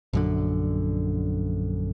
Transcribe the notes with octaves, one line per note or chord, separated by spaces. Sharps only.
A#1 F#2 D3